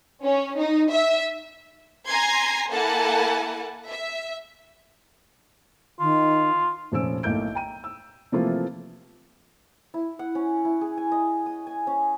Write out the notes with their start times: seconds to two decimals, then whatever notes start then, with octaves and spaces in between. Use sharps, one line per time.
0.23 C#4
0.58 D#4
0.92 E5
2.09 G#5 A#5 C6 G#6 A#6 C7
2.72 A#3 E4 A4 F#5 G#5 A5
3.89 E5
6.00 D#3 F4
6.92 F1 A#2 F3 C#4 E6 D7
7.23 B1 A2 A3 A#3 G6 D7
7.55 G5 A#5 D#7
7.84 E6
8.32 C3 E3 F3 A3 A#3 F4
9.94 E4
10.19 F#5
10.35 C#4
10.65 E4
10.81 G#4
10.97 G#5
11.12 D#5
11.46 D#6
11.67 G#5
11.87 C#4